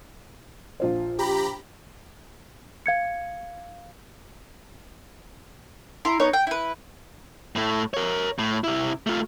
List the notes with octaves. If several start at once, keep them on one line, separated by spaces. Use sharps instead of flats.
A#1 F4 C5
G4 A#5 B5
F5 G#6 C#7
E4 A#5 C6
B3 D#4 C#5
G5
E4 B4
A2 A3
A#4 C#5
A2
C3 E4
A3 F4